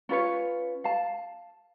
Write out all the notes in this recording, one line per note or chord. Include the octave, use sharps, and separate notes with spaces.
C#4 F4 B4 C#5
F5 A5